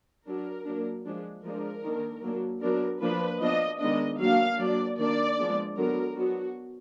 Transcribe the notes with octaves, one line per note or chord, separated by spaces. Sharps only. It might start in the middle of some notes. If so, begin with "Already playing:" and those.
F#3 D4 A#4
F#3 A#3 D4
F3 G#3 D4
F3 G#3 D4 A#4
D#3 A#3 D4
F#3 A#3 D4
F#3 B3 D4 A#4
F3 A#3 D4 B4
F3 B3 D4 D#5
D#3 G#3 B3 D4 D#5
F#3 A#3 D4 F5
F#3 A#3 D4 D5
D#3 A#3 D4 D5
F3 G#3 B3 D4
D3 F#3 B3 D4 A#4
F#3 B3 D4 F#4